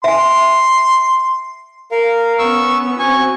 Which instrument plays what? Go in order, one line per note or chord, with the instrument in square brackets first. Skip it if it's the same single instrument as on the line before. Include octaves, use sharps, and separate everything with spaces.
[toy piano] E5 G#5 [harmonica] C6
[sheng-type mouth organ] A#4 F5
[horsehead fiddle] B3 C#4 [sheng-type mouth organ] C#6 E6
[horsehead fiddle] C4 F#4 [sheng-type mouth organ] G#5 C#6